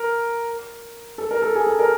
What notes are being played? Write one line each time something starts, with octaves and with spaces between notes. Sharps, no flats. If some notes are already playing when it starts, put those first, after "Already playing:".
Already playing: A#4
A4
A#4
A4
G#4
A4
A#4